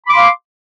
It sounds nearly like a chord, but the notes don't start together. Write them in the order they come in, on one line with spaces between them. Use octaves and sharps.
B5 D6 C6 F5